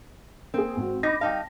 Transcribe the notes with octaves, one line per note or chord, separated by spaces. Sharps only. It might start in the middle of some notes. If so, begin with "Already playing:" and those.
A#3 C4 G#4
G#1 F#4
D#4 B5 D6 A#6
G3 D#4 F5 G5 A5